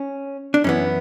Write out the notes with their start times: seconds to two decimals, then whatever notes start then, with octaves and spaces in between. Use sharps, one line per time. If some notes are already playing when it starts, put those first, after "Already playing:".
Already playing: C#4
0.54 D4
0.64 F#2 E3 B3 C#4